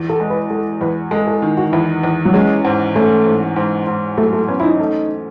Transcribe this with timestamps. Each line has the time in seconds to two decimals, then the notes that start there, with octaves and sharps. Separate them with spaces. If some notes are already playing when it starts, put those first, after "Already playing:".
Already playing: E2
0.09 A4
0.20 G#3
0.30 B4
0.50 G#3 A4
0.81 E2 B4
1.11 G#3 A4
1.27 A4
1.42 D#3
1.57 F#4
1.72 E2 E4
2.03 E2
2.25 F#3
2.34 G#3 C#4
2.65 G#2
2.96 A3 C#4
3.26 G#2
3.56 G#2
3.87 G#2
4.17 F#3 A3
4.33 A3
4.48 B3 C#4
4.60 E4
4.63 D#4
4.80 A3